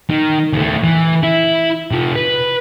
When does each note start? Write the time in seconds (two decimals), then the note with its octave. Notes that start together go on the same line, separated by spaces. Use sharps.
0.10 D#3
0.53 D#2 A3
0.84 E3
1.23 E4
1.92 C3 F3
2.16 B4